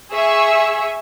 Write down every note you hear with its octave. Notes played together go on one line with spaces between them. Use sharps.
G#4 E5 C#6 E6